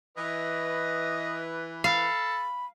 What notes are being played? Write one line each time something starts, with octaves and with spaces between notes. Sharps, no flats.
E3 B4 D#5
A4 F5 B5